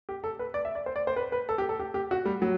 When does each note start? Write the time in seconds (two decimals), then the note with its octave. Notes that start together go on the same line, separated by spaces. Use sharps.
0.09 G4
0.24 A4
0.39 B4
0.54 D5
0.65 E5
0.75 D5
0.86 C5
0.96 D5
1.07 C5
1.16 B4
1.32 B4
1.49 A4
1.58 G4
1.69 A4
1.80 G4
1.94 G4
2.11 F#4
2.25 G3
2.42 F#3